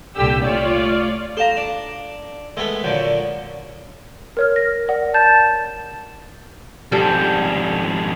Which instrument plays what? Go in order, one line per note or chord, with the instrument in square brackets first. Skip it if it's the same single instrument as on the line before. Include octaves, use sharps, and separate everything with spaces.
[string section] C2 A#2 D3 G4 E6
A3 F4 C#5 D5
[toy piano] A4 F5 [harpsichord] C5 A5 A#5
[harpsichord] D4
[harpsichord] G#3 A3 B3 [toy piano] A#4 B4
[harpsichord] A#2 D3 F#3 [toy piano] C#5 C#6
[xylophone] A#4 C#5 F6
A#6
D5 F#5
[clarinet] A5 [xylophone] G6
[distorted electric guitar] F2 G#2 [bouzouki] G3 A4